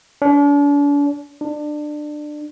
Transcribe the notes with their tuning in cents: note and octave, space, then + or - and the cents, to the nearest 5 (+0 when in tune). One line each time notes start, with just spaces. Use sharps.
D4 -40
D4 +25